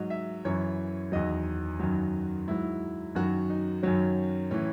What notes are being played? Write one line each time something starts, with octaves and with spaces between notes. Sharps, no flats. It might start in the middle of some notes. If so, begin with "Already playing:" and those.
Already playing: G#2 F#3 D#5
E5
F#2 E3 C#5
E2 D#3 F#3 D#5
F#2 D#3 F#3
G#2 F#3 E4
F#2 D#3 F#3 F#4
D#4
F#2 D#3 F#3 C#4
A2 E3 C#4